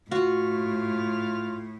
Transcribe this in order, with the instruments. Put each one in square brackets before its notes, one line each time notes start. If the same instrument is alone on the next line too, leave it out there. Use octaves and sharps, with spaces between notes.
[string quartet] A2 [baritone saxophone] F4 [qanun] F#4